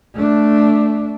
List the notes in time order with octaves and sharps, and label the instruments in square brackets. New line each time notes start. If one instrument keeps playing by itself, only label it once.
[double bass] A3 D4